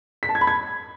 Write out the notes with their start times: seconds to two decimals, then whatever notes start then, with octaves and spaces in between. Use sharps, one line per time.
0.23 B6
0.29 A5
0.35 G#6
0.41 B5
0.47 G#6